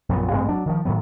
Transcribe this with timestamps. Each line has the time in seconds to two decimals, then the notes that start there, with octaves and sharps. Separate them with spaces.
0.09 A#1 F#2 A#2 B3
0.31 A1 G2 G#3 C4
0.49 F#3 D4
0.66 D#3 F3
0.85 A2 D#3 F#3 B3